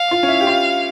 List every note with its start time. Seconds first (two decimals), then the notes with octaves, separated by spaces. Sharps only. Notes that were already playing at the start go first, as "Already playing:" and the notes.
Already playing: F5
0.11 F4
0.23 C#4
0.28 E4
0.41 G4
0.47 F4